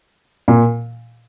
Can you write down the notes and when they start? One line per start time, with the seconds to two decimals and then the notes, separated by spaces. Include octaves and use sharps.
0.48 A#2